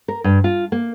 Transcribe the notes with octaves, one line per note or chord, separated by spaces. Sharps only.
A#4
G2
F4
A#3